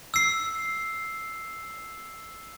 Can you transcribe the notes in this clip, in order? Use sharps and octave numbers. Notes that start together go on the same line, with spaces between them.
E6 C7